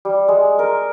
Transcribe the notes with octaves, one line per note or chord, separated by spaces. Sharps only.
G3
G#3
A#4